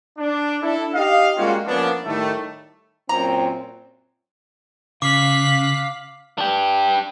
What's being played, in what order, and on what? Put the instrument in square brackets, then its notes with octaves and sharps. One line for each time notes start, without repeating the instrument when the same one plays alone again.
[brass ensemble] D4
D4 E4 A4
D#4 G4 D#5 F5
G3 G#3 A#3 C#4 F4 F#4
F3 A#3 B3 C#4 D4
A2 D#3 G3 A3
[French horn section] F#2 A#2 C4 [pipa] A#5
[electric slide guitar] C#3 [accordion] F5 [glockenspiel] D6 [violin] F#6 B6
[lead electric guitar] D4 G4